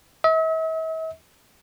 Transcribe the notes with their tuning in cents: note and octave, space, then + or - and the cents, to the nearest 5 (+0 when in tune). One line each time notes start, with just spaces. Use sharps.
E5 -45